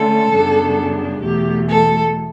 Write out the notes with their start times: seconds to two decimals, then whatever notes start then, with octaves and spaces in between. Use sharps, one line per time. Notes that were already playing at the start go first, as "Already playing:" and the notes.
Already playing: D3 A3 C#4 A4
0.32 F#2 C#3 G3 B3 D4
1.22 E2 B2 F#3 A3 G4
1.67 A4